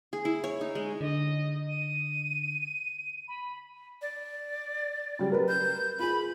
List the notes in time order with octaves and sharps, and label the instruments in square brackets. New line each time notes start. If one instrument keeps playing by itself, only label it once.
[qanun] G#4
E4
C#5
D#4
G#3
[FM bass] D3 [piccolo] D#5
[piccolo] D#7
B5
[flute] D5
[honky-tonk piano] C#3 F#3 G3
A#4 B4
[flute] G6
[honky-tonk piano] F4 G#4 [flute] B5